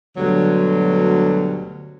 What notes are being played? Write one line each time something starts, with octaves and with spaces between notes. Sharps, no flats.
D2 G2 B2 D3 F#3